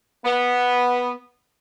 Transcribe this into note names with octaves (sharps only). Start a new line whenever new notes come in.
B3